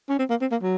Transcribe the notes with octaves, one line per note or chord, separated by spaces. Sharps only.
C#4
C4
A#3
C4
A#3
F#3